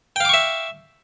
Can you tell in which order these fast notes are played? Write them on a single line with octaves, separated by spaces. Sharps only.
G5 F5 D6 C#6 E5